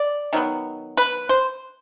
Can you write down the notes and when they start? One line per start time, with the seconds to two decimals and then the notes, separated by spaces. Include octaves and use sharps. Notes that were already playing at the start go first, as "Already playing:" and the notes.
Already playing: D5
0.33 D#3 F#3 B3
0.97 B4
1.29 C5